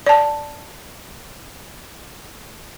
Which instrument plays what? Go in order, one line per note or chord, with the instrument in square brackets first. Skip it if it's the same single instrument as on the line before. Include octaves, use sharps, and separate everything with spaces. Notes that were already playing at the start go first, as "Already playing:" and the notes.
[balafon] D5 A5